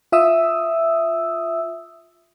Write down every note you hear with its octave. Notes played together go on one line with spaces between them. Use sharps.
F4 E5 D#6 E6